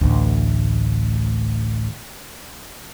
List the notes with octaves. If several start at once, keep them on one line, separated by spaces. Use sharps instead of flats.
A1 D2